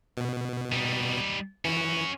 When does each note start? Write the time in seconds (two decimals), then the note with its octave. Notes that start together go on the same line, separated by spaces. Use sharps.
0.17 B2
0.72 G3 D#4
1.65 E3 C#4 F#4